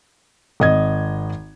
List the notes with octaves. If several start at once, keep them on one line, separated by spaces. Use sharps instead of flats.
G#1 D#5 G#6